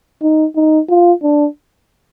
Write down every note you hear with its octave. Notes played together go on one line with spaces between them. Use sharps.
D#4
D#4
F4
D4